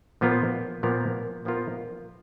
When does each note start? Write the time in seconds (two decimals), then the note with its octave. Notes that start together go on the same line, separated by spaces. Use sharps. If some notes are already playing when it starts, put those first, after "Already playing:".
0.21 A#2 F3 B3 F4 A#4
0.83 A#2 F3 B3 F4 A#4
1.45 A#2 F3 B3 F4 A#4